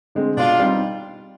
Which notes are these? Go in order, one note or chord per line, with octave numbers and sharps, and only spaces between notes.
D3 G#3 C4
B2 D4 F4
G3 C4 D#4